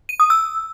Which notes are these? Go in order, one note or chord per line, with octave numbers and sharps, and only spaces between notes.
D#7
D#6
E6